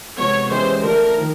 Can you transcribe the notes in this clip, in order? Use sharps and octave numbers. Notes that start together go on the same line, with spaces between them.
C3 F3 G#3 B3 C#5
E3 G#3 C#4 E4 G4 C5
D3 F3 A3 D4 A#4
D#3